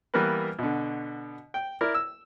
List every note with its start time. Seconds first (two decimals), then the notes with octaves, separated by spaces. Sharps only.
0.14 E3 G3 A#3 B3 A#4 B4
0.59 B2 D3
1.54 G5
1.81 E4 A#4 D5
1.95 E6